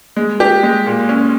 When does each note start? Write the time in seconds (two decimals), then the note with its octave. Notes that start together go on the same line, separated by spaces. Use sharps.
0.17 G#3
0.40 G4
0.63 G#3
0.86 A#2
1.09 C#4